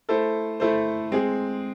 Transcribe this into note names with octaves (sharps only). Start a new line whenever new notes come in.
A3 E4 A4 C5
A3 E4 A4 C5
G#3 C4 G#4